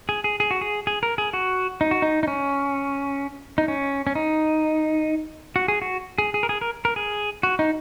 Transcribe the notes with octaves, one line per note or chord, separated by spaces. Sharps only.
G#4
G#4
G#4
F#4
G#4
G#4
A#4
G#4
F#4
D#4
F#4
D#4
D#4
C#4
D#4
C#4
C#4
D#4
F#4
G#4
F#4
G#4
G#4
A#4
G#4
A#4
A#4
G#4
F#4
D#4